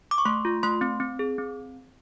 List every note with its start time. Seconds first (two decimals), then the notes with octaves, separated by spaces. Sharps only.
0.11 D6
0.18 C#6
0.25 A3 C6
0.45 F4
0.63 A3 C6
0.81 C4
1.00 C4
1.19 G#4
1.38 C4